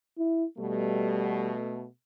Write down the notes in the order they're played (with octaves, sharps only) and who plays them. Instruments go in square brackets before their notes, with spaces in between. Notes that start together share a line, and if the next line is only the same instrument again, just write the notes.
[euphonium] E4
[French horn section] B2 A3 [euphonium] G3